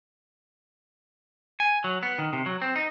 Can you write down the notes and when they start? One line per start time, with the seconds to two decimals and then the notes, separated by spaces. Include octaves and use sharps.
1.60 G#5
1.84 F#3
2.03 B3
2.18 D#3
2.33 C3
2.46 F#3
2.62 C4
2.76 D#4